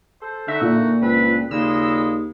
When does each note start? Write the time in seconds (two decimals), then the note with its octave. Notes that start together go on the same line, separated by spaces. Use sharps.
0.22 A4 C5
0.48 D3 A3 D#4 F#4 E5
0.61 A#2
1.01 C#2 C4 D4 B4
1.51 D#2 A#2 C#3 G#3 E6